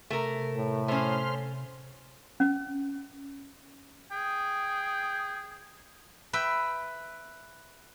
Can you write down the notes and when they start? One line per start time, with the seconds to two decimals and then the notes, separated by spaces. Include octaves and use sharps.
0.10 C3 A3 A#4
0.57 A2
0.88 A3 C#4 C5 C6 F6
2.40 C#4
4.11 G#4 G5
6.33 B4 E5 G5